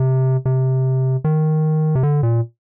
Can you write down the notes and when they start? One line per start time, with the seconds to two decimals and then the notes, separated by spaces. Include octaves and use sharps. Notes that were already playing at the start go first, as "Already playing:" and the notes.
Already playing: C3
0.45 C3
1.24 D#3
1.95 C3
2.03 D3
2.23 A#2